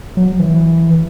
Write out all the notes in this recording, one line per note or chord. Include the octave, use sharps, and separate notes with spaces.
F#3
E3